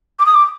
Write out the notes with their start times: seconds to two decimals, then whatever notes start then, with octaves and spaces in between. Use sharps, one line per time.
0.19 D6
0.26 D#6
0.34 D6